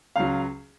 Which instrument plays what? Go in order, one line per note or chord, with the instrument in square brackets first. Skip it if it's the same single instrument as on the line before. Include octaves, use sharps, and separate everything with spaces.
[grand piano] C#2 C#3 F#3 F5